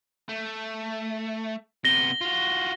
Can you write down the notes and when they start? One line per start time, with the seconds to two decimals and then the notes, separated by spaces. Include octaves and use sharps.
0.29 A3
1.85 C3 B3 A#6 G7
2.21 F4 F#4